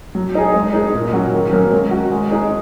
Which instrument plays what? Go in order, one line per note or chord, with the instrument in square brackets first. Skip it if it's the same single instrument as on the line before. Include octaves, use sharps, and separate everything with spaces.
[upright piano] F#3
D#4 G#4
G#3
D#4 G#4
A#2
F#3 C#4 F#4
D#3
F#3 A#3 C#4
G#3
F#4
G#3
D#4 G#4